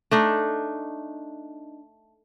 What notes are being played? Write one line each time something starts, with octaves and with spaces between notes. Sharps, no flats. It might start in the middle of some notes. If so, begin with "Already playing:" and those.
A3 D4 D#4